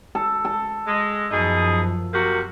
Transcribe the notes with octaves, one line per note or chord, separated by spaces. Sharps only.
A4
A4
G#3
F#2 B2 F3 D#4 G#4
C3 A#3 F#4